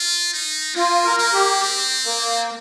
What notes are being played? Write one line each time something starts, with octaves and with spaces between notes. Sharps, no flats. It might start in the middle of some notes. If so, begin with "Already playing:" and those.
Already playing: F4
D#4
A#3 F4
A#4
A#3
G4
C4
A#3